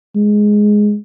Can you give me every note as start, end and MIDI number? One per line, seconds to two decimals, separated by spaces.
0.16 0.96 56